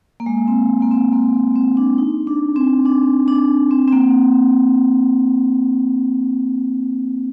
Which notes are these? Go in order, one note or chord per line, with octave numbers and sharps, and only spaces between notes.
A#3
G#3
C4
A#3
C4
A#3
A#3
C4
D4
D#4
D4
C4
D4
D4
C4
C4
A#3